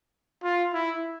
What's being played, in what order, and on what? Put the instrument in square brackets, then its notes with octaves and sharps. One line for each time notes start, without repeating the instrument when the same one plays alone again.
[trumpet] F4
E4